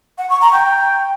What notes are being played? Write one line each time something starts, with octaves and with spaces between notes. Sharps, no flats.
F#5
C#6
A#5
G5